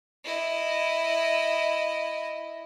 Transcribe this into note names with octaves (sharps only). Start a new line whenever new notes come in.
E4 D#5